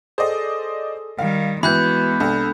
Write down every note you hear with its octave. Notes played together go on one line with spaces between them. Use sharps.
G#4 A4 C5 D5 D#5
D#3 G3 F5
E3 G#3 B3 F#4 B4 B5 F#6 G6
C2 D4 A4 F6